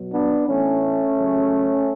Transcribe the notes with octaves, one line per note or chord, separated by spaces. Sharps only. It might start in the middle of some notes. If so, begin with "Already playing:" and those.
Already playing: B2 F#3
B3 D4
A2 E3 A3 C#4
C#3 F#3